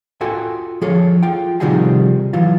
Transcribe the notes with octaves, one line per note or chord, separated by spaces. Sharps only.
F4 F#4 A4 G5 G#5
F3 G#4 A4 C#5
F4 G5
C3 D#3 F3 G3 F#4 G#4
E3 F#3 F4